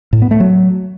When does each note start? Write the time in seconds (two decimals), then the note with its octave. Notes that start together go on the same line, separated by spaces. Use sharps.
0.13 A2
0.22 B3
0.31 A3
0.40 F#3